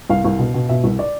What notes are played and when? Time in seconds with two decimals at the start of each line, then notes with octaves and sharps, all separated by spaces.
0.10 C2 F5
0.25 C2
0.39 B2
0.54 B2
0.69 B2 E5
0.84 C2
0.99 D5